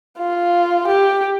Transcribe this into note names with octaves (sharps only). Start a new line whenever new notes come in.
F4
G4